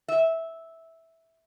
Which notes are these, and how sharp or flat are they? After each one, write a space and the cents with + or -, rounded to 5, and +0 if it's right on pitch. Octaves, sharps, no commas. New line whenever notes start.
E5 -10